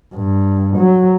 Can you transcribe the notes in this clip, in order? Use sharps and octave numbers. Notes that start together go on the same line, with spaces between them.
G2
F#3